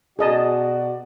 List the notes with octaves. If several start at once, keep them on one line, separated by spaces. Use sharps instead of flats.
B2 F#4 G#4 D5 D#5 A5